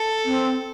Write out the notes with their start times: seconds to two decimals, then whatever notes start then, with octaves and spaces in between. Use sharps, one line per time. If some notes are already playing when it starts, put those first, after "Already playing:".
Already playing: A4
0.24 C4